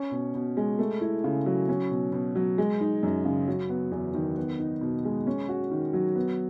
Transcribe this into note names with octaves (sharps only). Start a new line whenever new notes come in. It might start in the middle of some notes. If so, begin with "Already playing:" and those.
Already playing: C#4
B2
B2
G#3
A3
E4
C#3
F#3
C#4
B2
B2
F#3
G#3
D#4
F#2
C#3
F#3
B3
E2
D#3
B3
D#4
B2
G#3
C#4
F#4
D#3
F#3
B3